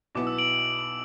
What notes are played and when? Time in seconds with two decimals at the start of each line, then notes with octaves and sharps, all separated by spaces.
0.15 B1 B2 B3 E4 D6
0.27 E6
0.38 D7 F#7